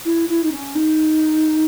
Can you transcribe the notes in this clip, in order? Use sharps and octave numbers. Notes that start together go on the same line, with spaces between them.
E4
E4
D#4
C#4
D#4